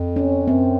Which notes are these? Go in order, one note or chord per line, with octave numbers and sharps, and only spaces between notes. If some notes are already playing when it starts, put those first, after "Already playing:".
Already playing: F2
C#4
F#2 C4